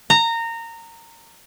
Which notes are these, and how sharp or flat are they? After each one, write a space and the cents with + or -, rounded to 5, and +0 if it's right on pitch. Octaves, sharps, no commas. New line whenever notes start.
A#5 -20